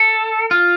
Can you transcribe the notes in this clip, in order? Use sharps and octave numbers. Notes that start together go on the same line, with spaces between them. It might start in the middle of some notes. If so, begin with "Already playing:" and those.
Already playing: A4
F4